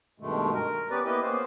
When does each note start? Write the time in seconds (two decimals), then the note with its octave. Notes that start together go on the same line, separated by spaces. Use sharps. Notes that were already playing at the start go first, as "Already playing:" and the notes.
0.20 G2 B2 D#3 G#3 A3
0.54 A#4
0.91 B3 C#4 G4 B4 D5
1.05 A#3 B3 E4 G4 B4 D#5
1.22 A#3 B3 C#4 C5